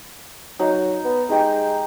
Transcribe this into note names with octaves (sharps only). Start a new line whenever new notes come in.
F#3 D#4
B3
G#3 D#4 G4